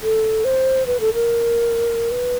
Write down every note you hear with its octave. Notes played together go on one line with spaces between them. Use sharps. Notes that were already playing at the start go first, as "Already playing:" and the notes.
A4
C5
B4
A4
A#4
B4